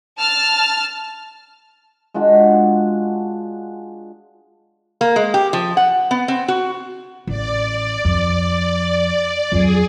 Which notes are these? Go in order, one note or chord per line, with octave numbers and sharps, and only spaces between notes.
A5 F6
G#3 D4 F4 F#4
A#3
G#3
G4
F3
F#5
B3
C4
F#4
A1 D5
F2
F2 F#3 G#4